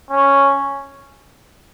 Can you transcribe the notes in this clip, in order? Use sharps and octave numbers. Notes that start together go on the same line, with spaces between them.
C#4